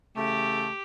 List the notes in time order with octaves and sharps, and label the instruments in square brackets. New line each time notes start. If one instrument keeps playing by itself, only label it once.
[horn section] C#3 E3 A3 [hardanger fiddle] G4